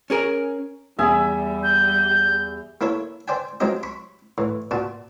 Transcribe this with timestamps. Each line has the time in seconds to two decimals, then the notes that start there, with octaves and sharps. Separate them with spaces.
0.10 C#4 G#4 A#4
0.99 E2 G3 E5 G#5 D#6
1.63 G6
2.81 A#3 E4 A4 C#5
3.28 C5 D5 G5 G#5
3.60 F3 F#3 G#3 C4 G4 D#5
3.83 B5 C#6
4.38 A2 E3
4.71 A#2 F#4 A5